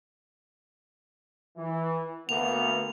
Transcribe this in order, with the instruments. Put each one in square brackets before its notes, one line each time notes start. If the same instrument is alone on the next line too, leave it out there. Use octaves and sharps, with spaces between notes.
[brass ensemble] E3
[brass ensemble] D2 A#3 B3 [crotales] F7